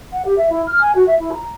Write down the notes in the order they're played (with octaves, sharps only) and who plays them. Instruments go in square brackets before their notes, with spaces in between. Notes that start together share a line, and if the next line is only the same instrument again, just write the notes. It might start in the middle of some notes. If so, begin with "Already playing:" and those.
[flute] F#5
G4
E5
E4
F6
G#5
F#4
E5
E4
A#5